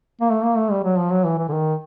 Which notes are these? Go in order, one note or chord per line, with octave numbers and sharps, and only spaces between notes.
A#3
A3
A#3
A3
G3
F#3
F3
F#3
E3
E3
D3
D#3